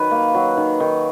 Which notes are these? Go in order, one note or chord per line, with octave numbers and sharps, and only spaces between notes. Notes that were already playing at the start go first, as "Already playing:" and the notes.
Already playing: D#3 F#3 B4
A#3
F#3
D#3
D#3